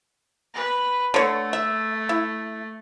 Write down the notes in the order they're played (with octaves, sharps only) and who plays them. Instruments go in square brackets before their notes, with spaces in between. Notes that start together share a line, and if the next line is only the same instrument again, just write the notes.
[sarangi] B4
[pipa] D3 C#5 [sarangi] A3
[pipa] E5
E4